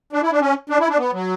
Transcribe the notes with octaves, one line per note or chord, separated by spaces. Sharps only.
D4
E4
D4
C#4
D4
E4
D4
B3
F#3